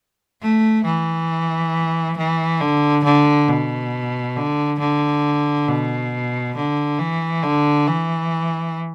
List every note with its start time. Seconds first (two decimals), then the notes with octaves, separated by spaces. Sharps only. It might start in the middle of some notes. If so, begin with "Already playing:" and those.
0.42 A3
0.85 E3
2.18 E3
2.61 D3
3.04 D3
3.48 B2
4.36 D3
4.80 D3
5.68 B2
6.56 D3
6.99 E3
7.44 D3
7.87 E3